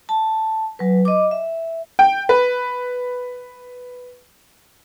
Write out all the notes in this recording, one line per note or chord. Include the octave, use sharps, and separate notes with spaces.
A5
F#3 B4
D#5 D6
E5
G5
B4